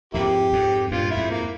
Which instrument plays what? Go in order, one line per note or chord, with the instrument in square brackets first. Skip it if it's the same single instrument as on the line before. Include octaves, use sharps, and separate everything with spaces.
[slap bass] F2 G#2 [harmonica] A#3 E4 G4
[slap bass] F2 G#2
[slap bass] G2 A#2 [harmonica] F4
[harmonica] E4
[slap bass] F2 G#2
[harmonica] A#3